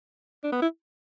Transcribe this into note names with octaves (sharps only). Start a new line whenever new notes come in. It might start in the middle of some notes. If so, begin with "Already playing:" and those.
D4
B3
E4